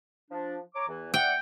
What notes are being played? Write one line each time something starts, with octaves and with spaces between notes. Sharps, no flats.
F3 D4
C#5 A#5 D6
E2 E3
D5 E5 F#5 G5